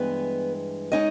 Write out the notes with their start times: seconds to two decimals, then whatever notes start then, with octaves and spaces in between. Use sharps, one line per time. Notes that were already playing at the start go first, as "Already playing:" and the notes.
Already playing: G2 E3 G#3 B3 B4
0.92 G#3 C#4 D#4 D#5